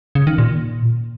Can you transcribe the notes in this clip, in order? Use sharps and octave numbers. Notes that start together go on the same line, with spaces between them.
C#3
D#3
A#2